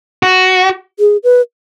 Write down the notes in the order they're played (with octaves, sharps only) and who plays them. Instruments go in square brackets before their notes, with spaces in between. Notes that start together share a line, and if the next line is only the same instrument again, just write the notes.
[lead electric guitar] F#4
[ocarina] G#4
B4